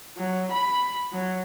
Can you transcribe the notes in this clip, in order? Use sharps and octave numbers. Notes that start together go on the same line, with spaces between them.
F#3
B5
F#3